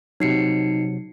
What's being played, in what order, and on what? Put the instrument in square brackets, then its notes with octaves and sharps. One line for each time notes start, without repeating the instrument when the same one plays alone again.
[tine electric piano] C3 F#3 [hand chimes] D#4 C7 C#7